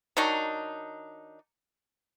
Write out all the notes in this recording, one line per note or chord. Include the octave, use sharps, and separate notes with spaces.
D#3 F#3 D4 D#4